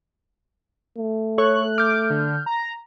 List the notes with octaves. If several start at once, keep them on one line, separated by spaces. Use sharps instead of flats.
A3
A4 C#5 C#6 F#6
D6 F6 G6
D3
A#5